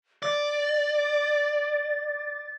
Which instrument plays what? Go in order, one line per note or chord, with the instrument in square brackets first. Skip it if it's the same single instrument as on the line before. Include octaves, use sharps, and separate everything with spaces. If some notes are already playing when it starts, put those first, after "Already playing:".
[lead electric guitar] D5 [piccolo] A6